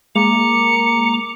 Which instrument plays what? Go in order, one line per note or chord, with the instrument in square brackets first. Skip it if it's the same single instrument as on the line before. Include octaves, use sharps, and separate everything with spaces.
[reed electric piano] G#3 [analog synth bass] A#3 [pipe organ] A#5 D6 [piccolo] C#7